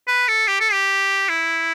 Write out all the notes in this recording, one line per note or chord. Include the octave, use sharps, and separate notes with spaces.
B4
A4
G4
A4
G4
E4